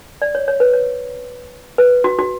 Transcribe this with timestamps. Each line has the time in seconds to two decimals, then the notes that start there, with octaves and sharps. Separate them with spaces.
0.22 D5
0.35 C#5
0.48 C#5
0.60 B4
0.73 C#5
1.78 B4
2.04 F#4
2.19 F#4